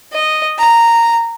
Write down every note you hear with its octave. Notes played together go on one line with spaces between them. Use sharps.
D#5
A#5